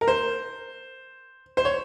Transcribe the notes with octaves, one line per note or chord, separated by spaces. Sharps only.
A#4
C5
C5
C#5